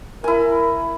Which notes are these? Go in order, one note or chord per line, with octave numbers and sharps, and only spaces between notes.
E4 A#4 G#5